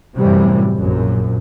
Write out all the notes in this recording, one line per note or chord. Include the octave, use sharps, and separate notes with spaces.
F#2 A2 C3 E3 G3
A#1 F#2